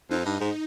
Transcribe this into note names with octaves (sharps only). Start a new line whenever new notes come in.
F2 D#4
G2
G#2